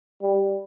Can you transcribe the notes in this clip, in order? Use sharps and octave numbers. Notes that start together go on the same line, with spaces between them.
G3